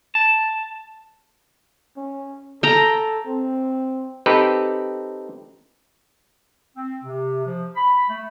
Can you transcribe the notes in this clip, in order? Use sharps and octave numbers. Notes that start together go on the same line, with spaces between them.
A5
C#4
A4 G5 A#5
C4
C4 D#4 G4 A4 B4
C4
C3
F3
B5
A3